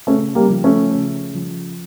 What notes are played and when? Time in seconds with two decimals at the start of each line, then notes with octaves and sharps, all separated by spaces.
0.07 C#3 A3 C#4
0.35 G3 A#3
0.50 F3
0.64 A3 C#4
0.92 C#3
1.35 F3